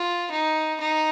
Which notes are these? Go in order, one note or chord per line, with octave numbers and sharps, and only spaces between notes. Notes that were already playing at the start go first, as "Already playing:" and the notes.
Already playing: F4
D#4
D#4